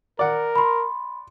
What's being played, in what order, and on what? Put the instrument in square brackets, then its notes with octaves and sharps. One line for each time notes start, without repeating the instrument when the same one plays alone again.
[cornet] A#4 [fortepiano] D5 F#5
[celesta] B5 C6